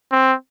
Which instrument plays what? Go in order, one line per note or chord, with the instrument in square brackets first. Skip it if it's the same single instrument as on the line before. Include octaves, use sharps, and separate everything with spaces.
[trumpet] C4